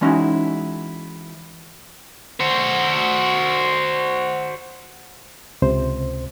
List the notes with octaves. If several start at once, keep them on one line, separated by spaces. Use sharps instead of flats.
E3 G#3 C#4 D#4 E4 F#4
F#4 C5
C#2 C3 C5